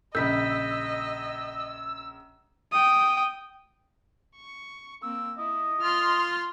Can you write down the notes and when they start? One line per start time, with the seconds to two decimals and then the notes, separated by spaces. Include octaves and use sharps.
0.15 A#1 C#3 D#5 B5 E6 G6 B6
2.72 G5 D#6
4.37 C#6
5.03 A#3 C4 E6
5.38 E4 D#5
5.81 F4 C6 F6